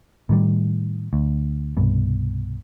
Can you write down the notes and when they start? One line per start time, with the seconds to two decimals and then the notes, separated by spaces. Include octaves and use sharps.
0.29 A2 D#3 G3
1.13 D2
1.77 C2 G2 B2